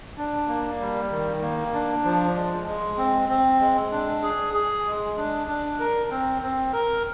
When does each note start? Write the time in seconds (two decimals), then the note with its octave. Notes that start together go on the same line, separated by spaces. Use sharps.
0.17 D4
0.48 A#3
0.80 G3
1.11 D#3
1.42 A#3
1.73 D4
2.05 F3
2.36 G#3
2.67 G#3
2.98 C4
3.29 C4
3.60 G#3
3.92 D4
4.23 G#4
4.54 G#4
4.86 G#3
5.17 D4
5.48 D4
5.80 A#4
6.10 C4
6.42 C4
6.73 A#4